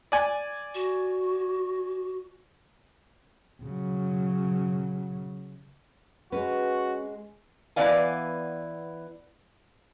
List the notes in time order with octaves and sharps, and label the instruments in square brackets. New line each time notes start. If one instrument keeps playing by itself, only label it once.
[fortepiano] D5 G#5
[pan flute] F#4
[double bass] C#3 F#3
[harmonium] G#3 [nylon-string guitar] C#4 B4 [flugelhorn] F#4
[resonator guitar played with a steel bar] E3 B3 D5 F5 G#5